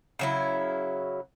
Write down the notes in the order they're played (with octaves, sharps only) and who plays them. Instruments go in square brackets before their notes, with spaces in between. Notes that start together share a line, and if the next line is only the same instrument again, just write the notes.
[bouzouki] C#3 F#3 E4